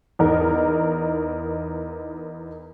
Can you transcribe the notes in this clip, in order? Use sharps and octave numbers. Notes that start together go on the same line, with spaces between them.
E2 D#4 A#4